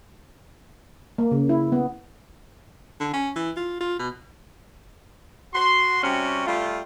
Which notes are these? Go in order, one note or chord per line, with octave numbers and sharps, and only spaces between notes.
A#3
C#3
E4
B3
D3
C#4
E3
F4
F4
B2
F#4 C6
C3 G3 C#4 F#4
G3 A3 F4